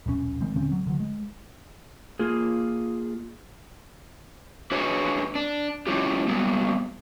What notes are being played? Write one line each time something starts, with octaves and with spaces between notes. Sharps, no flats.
D#1 B1 A#2 C#4
D#3 G#3 C4
D#1 D3 C4 C#4
F#3
D3 F#3
G#3
A#3 F4 G#4
D4 F#4 G#4 B4 C#5
D4
F#3 G#3 C#4 E4 F4 G4
F#3 G3 A#3 B3